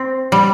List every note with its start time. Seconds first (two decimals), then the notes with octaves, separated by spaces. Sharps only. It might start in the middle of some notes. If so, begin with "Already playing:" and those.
Already playing: C4
0.32 G3